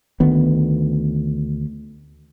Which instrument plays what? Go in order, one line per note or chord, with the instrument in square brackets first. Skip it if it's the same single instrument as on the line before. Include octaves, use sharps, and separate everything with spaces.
[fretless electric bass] D2 D#3 B3